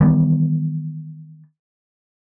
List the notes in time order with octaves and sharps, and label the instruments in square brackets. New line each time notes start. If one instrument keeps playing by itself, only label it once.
[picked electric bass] D#3 E3 G3 B3